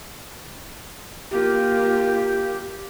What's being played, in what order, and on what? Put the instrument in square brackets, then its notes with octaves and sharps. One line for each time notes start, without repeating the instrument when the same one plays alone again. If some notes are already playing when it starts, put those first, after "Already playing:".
[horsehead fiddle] A#3 F4 [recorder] G4